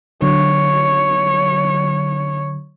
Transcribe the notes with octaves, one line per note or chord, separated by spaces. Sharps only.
D3 F#3 C#5